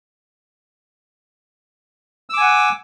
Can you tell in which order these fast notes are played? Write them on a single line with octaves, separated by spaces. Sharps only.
E6 D6 G#5 F#5